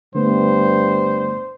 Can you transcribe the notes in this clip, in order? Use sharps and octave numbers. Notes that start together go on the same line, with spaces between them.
G2 D3 A3 B3 C5